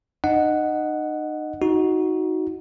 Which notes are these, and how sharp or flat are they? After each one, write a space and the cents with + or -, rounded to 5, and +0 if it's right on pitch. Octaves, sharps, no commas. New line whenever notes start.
D#4 -40 D#5 -10 F#5 +0
D#4 +20 F#4 +0